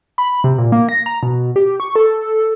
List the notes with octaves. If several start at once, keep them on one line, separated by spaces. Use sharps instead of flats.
B5
C3
A#2
A#3
A#6
A#5
B2
G4
C#6
A4